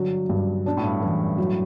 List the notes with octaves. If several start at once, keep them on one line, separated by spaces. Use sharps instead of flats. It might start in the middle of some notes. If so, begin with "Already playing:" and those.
Already playing: G2 D3 F#3
G2
B2 D4
A2
G2
F#2 E3
G2
F#3